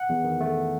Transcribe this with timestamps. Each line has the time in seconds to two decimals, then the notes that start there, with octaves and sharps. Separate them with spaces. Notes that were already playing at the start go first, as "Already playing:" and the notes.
Already playing: F#5
0.09 E2
0.24 D#3
0.40 A3